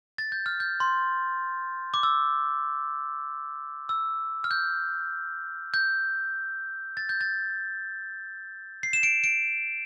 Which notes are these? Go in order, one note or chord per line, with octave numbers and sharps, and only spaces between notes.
A6
G6
F6
G6
C6
D6
E6
E6
F6
G6
G6
A6
G6
A6
C7
E7
D7
D7